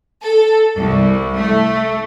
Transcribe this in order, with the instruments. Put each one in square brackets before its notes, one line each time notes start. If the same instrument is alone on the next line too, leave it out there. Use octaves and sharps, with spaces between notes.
[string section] A4
C2
A3